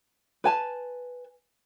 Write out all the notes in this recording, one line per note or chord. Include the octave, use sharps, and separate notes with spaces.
B4 G#5 A5